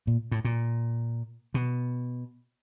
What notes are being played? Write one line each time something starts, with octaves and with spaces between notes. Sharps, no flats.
A#2
A2
A#2
B2